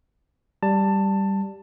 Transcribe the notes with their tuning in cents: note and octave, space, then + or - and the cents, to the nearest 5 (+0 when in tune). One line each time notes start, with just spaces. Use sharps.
G3 +0 A5 +15